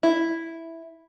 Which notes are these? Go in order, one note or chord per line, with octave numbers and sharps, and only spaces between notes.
E4